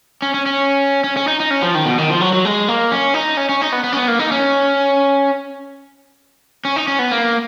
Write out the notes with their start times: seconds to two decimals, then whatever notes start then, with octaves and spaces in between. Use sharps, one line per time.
0.22 C#4
0.34 C#4
0.46 C#4
1.04 C#4
1.17 C#4
1.28 D#4
1.40 D#4
1.51 C#4
1.63 F3
1.75 D#3
1.85 B2
1.98 D#3
2.10 F3
2.21 F#3
2.33 F#3
2.45 G#3
2.68 A#3
2.92 C#4
3.14 D#4
3.37 C#4
3.49 C#4
3.62 D#4
3.73 B3
3.84 B3
3.92 C#4
3.96 B3
4.08 A#3
4.19 D#4
4.32 C#4
6.65 C#4
6.76 D#4
6.88 C#4
6.99 B3
7.11 A#3